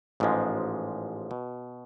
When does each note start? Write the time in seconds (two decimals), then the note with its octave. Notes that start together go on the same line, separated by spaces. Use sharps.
0.20 A1 G#2 F3 G#3
1.31 B2